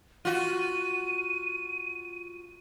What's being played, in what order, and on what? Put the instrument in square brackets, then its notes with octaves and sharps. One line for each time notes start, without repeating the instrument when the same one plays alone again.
[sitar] F4 F#4 [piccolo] D#7